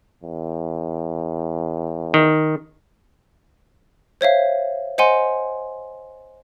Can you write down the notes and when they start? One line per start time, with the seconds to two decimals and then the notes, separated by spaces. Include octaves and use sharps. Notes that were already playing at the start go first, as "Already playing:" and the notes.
0.23 E2
2.14 D#3
4.21 C5 C#5 E5 F5
4.98 C5 D#5 F#5 G#5 C6